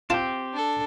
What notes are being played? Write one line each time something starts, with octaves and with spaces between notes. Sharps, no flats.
C4 F4 G4 A5
D4 A4